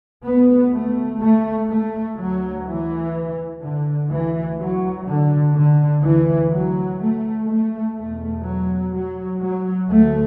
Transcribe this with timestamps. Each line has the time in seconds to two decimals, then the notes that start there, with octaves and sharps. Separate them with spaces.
0.24 D2 B3
0.72 A3
1.20 A3
1.68 A3
2.17 D2 F#3
2.65 E3
3.62 D3
4.10 D2 E3
4.58 F#3
5.06 D3
5.54 D3
6.03 D2 E3
6.51 F#3
7.00 A3
7.48 A3
7.96 E2 B2 A3
8.44 F#3
8.93 F#3
9.41 F#3
9.89 D2 A3